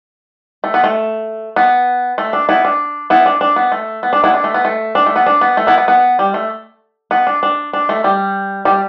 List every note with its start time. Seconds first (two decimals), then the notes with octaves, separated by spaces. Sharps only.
0.64 A3
0.74 B3
0.84 A3
1.56 B3
2.18 A3
2.33 D4
2.49 B3 E4
2.65 D4
3.10 B3 E4
3.26 D4
3.41 D4
3.56 B3
3.72 A3
4.03 B3
4.13 D4
4.24 B3 E4
4.34 D4
4.44 A3
4.54 B3
4.65 A3
4.95 D4
5.06 A3
5.16 B3
5.26 D4
5.41 B3
5.57 A3
5.67 B3 E4
5.78 B3
5.88 B3
6.19 G3
6.34 A3
7.11 B3
7.27 D4
7.43 D4
7.73 D4
7.89 A3
8.04 G3
8.65 G3